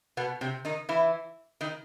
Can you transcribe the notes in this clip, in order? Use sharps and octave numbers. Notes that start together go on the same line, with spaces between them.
B2 B3
C3 C4
D#3 D#4
E3 E4
D#3 D#4